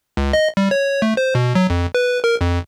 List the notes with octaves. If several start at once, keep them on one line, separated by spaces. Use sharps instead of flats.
C#2
D#5
G3
C#5
A3
C5
B2
F#3
F2
B4
A#4
F2